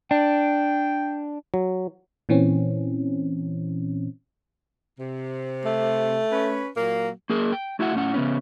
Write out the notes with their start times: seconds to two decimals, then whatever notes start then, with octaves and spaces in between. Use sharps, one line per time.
0.11 D4 G5
1.54 F#3
2.29 A#2 E3 C4 C#4
4.99 C3
5.65 A3
6.32 C#4 B4
6.77 A#2 F#3 A#3
7.30 A#3 G#4 A#4
7.52 G5
7.79 A3 E4 F#4 E5 F#5
7.95 A2 C#4 F#5
8.14 C#3 B3 C#4